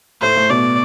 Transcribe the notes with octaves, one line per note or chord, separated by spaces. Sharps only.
A2 A3 C5
A2 A3
B2 B3 D5